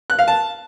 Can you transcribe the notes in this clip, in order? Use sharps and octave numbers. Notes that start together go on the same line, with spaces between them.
F#6
F5
A5